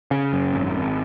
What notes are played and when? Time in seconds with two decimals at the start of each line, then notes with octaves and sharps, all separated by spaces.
0.11 C#3
0.33 F#2
0.53 G#1
0.74 G#1